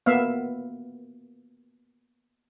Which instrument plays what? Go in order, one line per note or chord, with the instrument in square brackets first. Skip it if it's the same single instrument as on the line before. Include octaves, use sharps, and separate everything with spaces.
[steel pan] A#3 B3 E5 F5